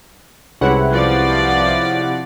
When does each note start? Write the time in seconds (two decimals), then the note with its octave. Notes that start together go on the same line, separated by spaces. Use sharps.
0.61 C2 C3 G#3 C#4 E4 B4 F#5
0.91 F3 D5